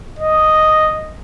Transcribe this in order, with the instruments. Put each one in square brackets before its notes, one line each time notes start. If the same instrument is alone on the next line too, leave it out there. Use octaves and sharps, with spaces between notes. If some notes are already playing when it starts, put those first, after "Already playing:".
[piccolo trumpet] D#5